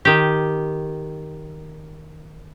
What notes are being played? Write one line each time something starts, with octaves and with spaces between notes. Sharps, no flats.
D#3 G4